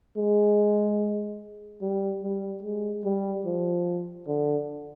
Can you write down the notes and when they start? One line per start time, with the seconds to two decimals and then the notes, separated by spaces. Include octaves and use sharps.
0.17 G#3
1.81 G3
2.23 G3
2.63 G#3
3.04 G3
3.45 F3
4.27 D3